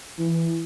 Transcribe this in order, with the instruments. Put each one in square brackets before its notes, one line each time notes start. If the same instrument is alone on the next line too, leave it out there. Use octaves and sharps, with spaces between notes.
[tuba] E3